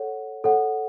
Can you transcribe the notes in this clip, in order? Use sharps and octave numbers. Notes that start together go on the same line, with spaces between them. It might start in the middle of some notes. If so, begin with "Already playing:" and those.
Already playing: A4 C#5 F#5
A4 C#5 F#5